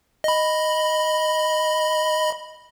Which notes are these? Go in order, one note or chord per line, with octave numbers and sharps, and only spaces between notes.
D#5 B5